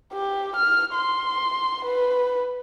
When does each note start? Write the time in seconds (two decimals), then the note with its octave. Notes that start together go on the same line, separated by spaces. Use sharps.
0.13 G4
0.56 F6
0.95 C6
1.85 B4